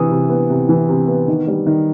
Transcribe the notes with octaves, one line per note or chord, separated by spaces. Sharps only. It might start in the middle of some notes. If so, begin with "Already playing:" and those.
Already playing: C3 E3 D#6
C3
B3
C3
E3
C3
B3
D#3
G3
D#3